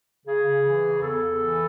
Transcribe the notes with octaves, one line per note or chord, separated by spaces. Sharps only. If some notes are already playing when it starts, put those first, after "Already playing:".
C#3 G#4
C#3
E3
C#3
E2 A4
E2
E3